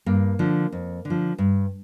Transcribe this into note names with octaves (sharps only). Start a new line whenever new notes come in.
G2 A#3
D3 F3
F2
D3
F3
G2